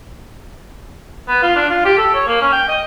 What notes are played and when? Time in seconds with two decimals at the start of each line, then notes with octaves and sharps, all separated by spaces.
1.28 B3
1.42 F4
1.56 D4
1.69 F4
1.85 G4
1.98 A4
2.14 C#5
2.27 A#3
2.41 C#4
2.52 G5
2.68 D#5